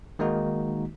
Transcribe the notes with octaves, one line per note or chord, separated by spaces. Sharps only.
D#3 G#3 A#3 D#4 F#4